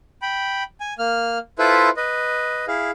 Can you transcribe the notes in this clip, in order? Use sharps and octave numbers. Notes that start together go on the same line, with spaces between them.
G5 B5
G#5
A#3 F6
E4 F4 A4 B4 C5 E5
B4 D#5
E4 G#4 F5